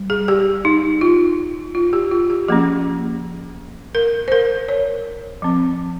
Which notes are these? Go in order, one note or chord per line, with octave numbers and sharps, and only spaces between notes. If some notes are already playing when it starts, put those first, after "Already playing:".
Already playing: G3
G#4
G4
D#4
F4
F4
G4
F4
G4
F3 A#3 C#4 G#4
A#4
C5
A#4
C#5
F3 C4